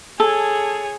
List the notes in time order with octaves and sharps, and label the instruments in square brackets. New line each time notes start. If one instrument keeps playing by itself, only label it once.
[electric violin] G#4 C#5 [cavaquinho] A4